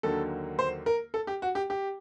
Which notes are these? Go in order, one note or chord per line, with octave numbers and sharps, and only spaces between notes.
D#2 D3 F#3 A#3 A4
C5
A#4
A4
G4
F#4
G4
G4